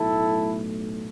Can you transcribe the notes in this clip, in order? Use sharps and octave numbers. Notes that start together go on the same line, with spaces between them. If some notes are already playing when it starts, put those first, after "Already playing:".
Already playing: B1 A2 A3 E4 A4